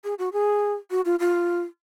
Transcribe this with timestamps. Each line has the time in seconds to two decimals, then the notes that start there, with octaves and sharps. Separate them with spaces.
0.04 G#4
0.19 F#4
0.33 G#4
0.91 F#4
1.05 F4
1.20 F4